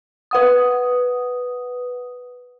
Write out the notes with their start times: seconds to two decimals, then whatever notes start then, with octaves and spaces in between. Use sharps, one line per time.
0.31 B4 F#5 D#6